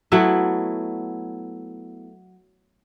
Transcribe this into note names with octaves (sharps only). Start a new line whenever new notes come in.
F#3 A3 B3 E4